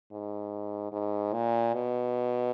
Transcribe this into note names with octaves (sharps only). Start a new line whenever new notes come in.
G#2
G#2
A#2
B2